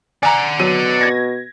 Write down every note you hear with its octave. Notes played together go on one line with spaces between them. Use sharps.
D5 F#5 G#5 A#5
B2 F#3 D#7
G#6 A#6